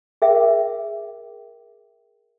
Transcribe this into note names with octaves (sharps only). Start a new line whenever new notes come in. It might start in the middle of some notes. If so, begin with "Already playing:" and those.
G#4 A#4 E5 G5